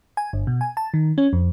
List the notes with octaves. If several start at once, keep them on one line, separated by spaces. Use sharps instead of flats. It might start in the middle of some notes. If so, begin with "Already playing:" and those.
G#5
G1
B2
G#5
A5
D#3
C#4
F2